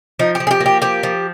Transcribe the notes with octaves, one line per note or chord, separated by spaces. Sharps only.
F3 D#4
G4
F3
G#4
G4
A#3
G4
F3 G4
F3